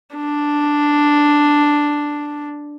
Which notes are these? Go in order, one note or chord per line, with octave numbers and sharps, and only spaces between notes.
D4